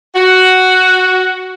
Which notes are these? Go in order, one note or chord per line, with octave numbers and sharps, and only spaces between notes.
F#4